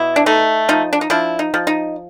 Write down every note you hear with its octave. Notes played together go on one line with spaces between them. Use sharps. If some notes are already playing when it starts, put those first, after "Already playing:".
Already playing: B2 E4
D4
A3 D#4
F3 D#4
D4
D#4
F3 D4 E4
D#4
F3
D#4